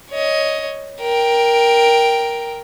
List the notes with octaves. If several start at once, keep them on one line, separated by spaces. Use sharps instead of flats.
C#5 D#5
A#4 G5